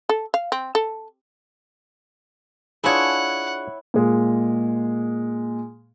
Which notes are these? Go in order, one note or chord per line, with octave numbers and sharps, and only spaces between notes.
A4
F5
C4
A4
D4 E4 F4 G#4 C#5 F#5
A#2 G#3